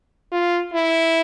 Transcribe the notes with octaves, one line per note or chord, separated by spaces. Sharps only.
F4
E4